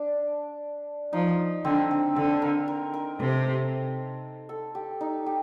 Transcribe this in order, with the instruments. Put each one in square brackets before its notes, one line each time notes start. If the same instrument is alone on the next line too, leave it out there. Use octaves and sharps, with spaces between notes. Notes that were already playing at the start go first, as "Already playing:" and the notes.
Already playing: [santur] D4
[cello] F3 [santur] D#4
[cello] D3 [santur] C4
[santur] C4
[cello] D3 [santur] A4
[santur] A#4
A#4
A#4
[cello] C3 [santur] A4
[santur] A4
G4
D#4
G4